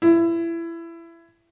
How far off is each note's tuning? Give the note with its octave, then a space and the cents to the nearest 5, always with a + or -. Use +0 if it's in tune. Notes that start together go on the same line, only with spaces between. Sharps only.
E4 +20